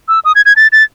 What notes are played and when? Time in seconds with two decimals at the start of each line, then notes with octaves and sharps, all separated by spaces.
0.09 E6
0.25 D#6
0.35 G#6
0.46 G#6
0.56 A6
0.72 A6